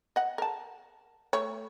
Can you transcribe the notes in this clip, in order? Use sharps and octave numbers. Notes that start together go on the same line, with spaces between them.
D#5 F#5
A#4 A5
A3 C#5